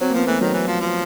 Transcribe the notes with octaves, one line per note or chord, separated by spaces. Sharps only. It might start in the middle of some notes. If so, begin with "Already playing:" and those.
F#3 C4
A#3
F3 B3
E3 A3
D#3 F#3
E3
F3
F3